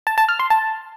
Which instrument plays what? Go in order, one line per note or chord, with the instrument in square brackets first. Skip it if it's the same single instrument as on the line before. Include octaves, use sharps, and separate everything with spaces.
[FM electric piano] A5
A5
F6
C6
A5